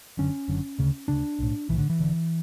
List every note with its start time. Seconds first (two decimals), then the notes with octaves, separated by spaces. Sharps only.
0.17 F#1 F#2 D3 C#4
0.48 F#1 F#2 D3
0.79 D2 C#3
1.08 D2 C#3 D4
1.39 B1 A2
1.69 B1 A2 E3
1.78 D3
1.90 E3
1.99 E1 E2 D3